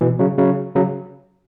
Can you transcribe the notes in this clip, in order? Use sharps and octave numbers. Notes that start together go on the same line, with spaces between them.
B2 E3
C#3 F#3
C#3 F#3
C#3 F#3